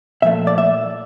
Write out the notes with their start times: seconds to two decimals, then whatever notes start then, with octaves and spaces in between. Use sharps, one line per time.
0.22 A#2 F3 A3 E5
0.47 D5
0.58 E5